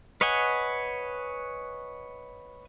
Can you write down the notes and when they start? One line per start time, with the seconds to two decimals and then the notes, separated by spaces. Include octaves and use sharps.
0.21 B4 C#5 D#5 F#5 G#5